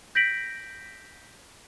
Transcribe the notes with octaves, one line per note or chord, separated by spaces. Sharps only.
G6 A#6 B6 D7 F#7